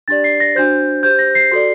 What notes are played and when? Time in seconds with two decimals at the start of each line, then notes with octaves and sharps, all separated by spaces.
0.08 D4 G4 D5 A6
0.24 C7
0.40 A#6
0.55 D4 F#4 C5 G6
1.03 G4 C5 G6
1.19 A#6
1.35 C7
1.52 F#4 A4 D5